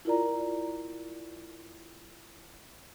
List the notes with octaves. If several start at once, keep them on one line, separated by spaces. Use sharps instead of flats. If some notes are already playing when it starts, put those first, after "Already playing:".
E4 F4 A#4 D5 A#5